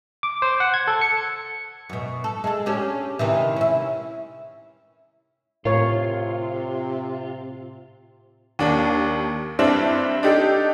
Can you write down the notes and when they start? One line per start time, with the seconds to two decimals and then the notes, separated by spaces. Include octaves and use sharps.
0.23 D6
0.42 C5
0.60 F#5
0.74 G#6
0.88 A4
1.01 C#7
1.89 F#2 B2
2.24 A4
2.44 G#3 A4
2.66 C#4 D4 G4
3.19 C3 D#3 E3
3.56 C#4 E4
5.65 A2 C3 F4 A#4 C#5
8.59 D#2 A#3 D4
9.59 G2 C4 D4 E4
10.23 D4 D#4 G4 A4